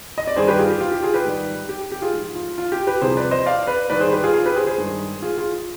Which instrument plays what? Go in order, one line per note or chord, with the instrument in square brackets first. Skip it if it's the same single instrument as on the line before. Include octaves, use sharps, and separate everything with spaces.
[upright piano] D#5
D5
G2 D#3 G3 G#4 C5
G4 B4
F4 G#4
G4
F4
G4
F4 G#4
G4 B4
G#2 D#3 G3
G4
G4
F4 G#4
G#2 F3 G#3
F4
F4
G4
G4 B4
C2 C3 F3 G#4 C5
B4 D5
C5 D#5
D5 F5
B4 D5
G#2 D#3 G3 B4 D5
G#4 C5
G4 B4
F4 G#4
F4 G#4
G4 B4
G#4 C5
G#4 C5
G2 D#3 G#3
F4 G#4
F4 G#4
F4